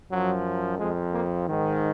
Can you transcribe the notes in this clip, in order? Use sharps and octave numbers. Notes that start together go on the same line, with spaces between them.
F#2 F3 F#3
F2 F3 G#3
A#3
G#2 D#3